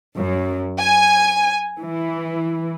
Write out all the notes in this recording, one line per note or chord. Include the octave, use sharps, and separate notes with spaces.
F#2
G#5
E3